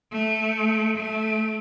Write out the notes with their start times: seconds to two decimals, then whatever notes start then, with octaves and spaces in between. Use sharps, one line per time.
0.12 A3
0.97 A3